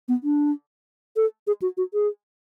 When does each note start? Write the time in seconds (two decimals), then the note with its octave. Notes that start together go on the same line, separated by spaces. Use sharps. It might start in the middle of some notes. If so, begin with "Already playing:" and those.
0.08 B3
0.24 D4
1.16 A4
1.47 G#4
1.62 F#4
1.77 F#4
1.94 G#4